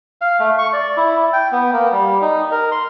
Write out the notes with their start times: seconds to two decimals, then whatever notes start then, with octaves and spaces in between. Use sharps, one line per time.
0.21 F5
0.40 A3
0.58 C#6
0.73 D5
0.97 E4
1.33 G5
1.52 B3
1.73 A#3
1.92 G3
2.21 D#4
2.51 A#4
2.72 C6